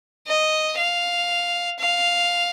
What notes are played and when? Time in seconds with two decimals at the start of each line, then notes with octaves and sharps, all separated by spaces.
0.27 D#5
0.78 F5
1.79 F5